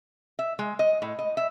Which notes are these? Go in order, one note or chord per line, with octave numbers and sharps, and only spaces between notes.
E5
G#3
D#5
A2
D#5
E5